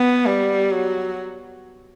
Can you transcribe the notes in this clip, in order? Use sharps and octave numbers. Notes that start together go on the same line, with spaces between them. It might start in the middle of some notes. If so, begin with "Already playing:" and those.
Already playing: B3
G3
F#3